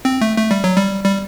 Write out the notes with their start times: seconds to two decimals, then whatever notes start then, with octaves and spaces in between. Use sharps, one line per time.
0.05 C4
0.21 A3
0.38 A3
0.51 G3
0.64 F#3
0.77 G3
1.04 G3